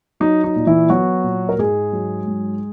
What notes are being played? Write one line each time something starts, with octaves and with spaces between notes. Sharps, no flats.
F#3 D#4
D#4
A#2
E3 E4
F#3 B3 F#4
A#2
A#4
G#2 G#3 G#4
F#3
G#2